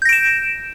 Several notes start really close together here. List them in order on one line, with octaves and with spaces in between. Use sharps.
G6 A#6 D7 E7